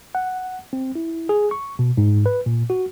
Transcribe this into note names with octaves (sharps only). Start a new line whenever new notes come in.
F#5
C4
E4
G#4
C#6
B2
G#2
B4
A#2
F#4